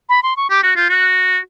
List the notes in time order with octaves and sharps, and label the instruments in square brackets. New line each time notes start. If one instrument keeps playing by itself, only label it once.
[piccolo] B5
C6
C#6
[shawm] G4 [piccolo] D6
[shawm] F#4 [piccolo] F#6
[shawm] F4 [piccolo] G6
[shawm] F#4 [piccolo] F#6